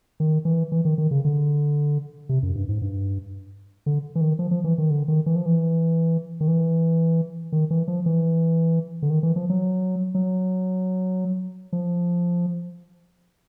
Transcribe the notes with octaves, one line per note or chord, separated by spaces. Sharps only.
D#3
E3
E3
D#3
D#3
C#3
D3
C3
F#2
G2
G#2
G2
D3
E3
D#3
F3
F3
E3
D#3
D3
D#3
E3
F3
E3
D#3
E3
D#3
E3
F3
E3
D3
D#3
E3
F3
F#3
F#3
F3